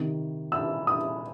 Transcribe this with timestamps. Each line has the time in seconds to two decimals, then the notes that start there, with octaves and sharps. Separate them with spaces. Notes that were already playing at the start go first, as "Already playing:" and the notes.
Already playing: C3 D#3
0.52 E6
0.87 D#6